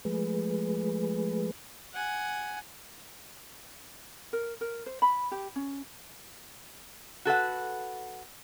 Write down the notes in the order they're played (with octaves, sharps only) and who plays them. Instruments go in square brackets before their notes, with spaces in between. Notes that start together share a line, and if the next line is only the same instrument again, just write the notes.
[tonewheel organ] F3 G#3 A3 G#4 B4
[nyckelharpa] F#5 G#5
[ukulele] A#4
A#4
C5
B5
G4
C#4
[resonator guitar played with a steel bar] F#4 A4 B4 F#5